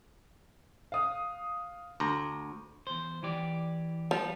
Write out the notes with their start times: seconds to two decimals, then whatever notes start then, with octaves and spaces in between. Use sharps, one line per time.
0.92 F5 D#6
2.00 D2 A#5
2.87 E2 C5
3.23 E3 G4 D5
4.11 F3 G3 B3